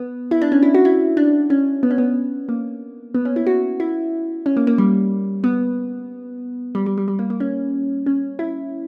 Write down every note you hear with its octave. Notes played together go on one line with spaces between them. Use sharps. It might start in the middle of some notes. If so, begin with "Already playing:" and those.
Already playing: B3
E4
D4
C#4
E4
F#4
E4
D4
C#4
B3
C#4
B3
A#3
B3
C#4
E4
F#4
E4
C#4
A#3
A#3
G3
B3
G3
G3
G3
G3
A#3
A#3
C#4
C#4
E4